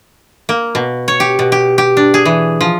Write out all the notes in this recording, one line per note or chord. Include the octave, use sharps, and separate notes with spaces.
A#3
B2
C#5
G4
B2
G4
G4
D4
G#4
E3
F3